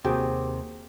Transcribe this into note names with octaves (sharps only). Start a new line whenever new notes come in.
D#2 C3 A#3 F#4 G#4 G5